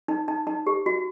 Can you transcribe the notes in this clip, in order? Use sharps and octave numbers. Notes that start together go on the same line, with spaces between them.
D#4
D#4
D#4
G4
F#4